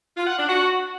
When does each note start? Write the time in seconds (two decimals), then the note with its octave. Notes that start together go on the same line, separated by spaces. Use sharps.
0.16 F4
0.27 F#5
0.37 D4
0.48 F#4